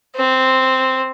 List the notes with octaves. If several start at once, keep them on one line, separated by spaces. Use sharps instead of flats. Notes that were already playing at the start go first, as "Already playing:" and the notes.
C4